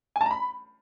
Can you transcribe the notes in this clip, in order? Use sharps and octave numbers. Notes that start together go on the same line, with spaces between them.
G#5
A5
A#5
B5